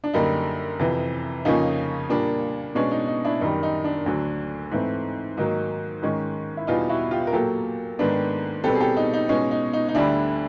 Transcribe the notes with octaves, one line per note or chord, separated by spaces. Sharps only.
D4
F#2 D3 G3 A#3 D#4
F2 C3 E3
F2 C#3 F3 A#3 C#4 D#4
A#2 G3 A#3 D4
B2 G#3 C#4 D4
D#4
D#4
D4 E4
F#2 D#3 G3 D#4
D#4
D4
D2 D3 F#3
G#2 E3 A3 C4
G#2 D#3 F#3 A#3 D#4
G#2 D#3 G#3 C#4
E4
E2 B2 G3 D#4 F4
E4 F#4
F4 G4
A#4
A#2 F#3 A#3 G4 A4
G#2 D#3 G#3 B3 D4
B2 G3 C4 G4 A4
G#4
G4 A4
D#4
D#4
B2 G#3 C#4 D#4
D#4
D#4
D#4
D2 D3 G3 D4 E4